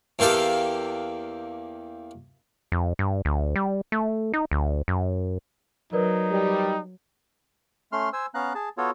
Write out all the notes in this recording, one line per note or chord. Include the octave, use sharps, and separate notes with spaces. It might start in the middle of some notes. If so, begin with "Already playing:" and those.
E2 A#3 G4 A4 F5
F2
G2
D2
G3
A3
D#4
D2
F#2
F#3 D#4 A#4 B4 D5
G3
A3 C#4 C6 F6
C5 G#5 E6
B3 C#4 F5 A#5 F#6
G#4 A5
B3 F4 F#4 A4 C#5